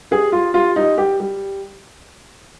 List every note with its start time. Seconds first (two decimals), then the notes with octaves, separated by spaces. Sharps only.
0.11 G3 G#4
0.32 G3 F4
0.54 G3 F4
0.76 G3 D#4
0.97 G3 G4
1.20 G3